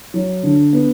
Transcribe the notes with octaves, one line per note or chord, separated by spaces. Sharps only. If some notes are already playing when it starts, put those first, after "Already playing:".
F#3
D3
B3